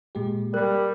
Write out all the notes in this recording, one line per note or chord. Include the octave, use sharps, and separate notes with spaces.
A#2 G#3 G4
G3 A#4 F#6